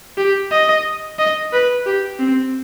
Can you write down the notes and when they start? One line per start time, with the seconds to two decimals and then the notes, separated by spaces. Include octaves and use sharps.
0.18 G4
0.52 D#5
1.19 D#5
1.53 B4
1.86 G4
2.19 C4